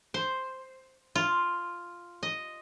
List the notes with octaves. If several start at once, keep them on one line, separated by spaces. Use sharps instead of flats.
C5
F4
D#5